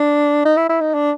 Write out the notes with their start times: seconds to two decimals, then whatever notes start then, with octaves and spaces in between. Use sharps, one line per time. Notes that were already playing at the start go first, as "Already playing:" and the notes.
Already playing: D4
0.45 D#4
0.57 E4
0.69 E4
0.81 D#4
0.94 D4